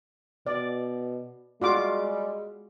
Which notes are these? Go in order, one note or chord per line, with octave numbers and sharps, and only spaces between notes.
B2 D5
G3 G#3 F4 F#4 D6